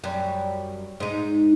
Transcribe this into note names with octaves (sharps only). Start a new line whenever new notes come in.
F#2 G3
G#2 D#4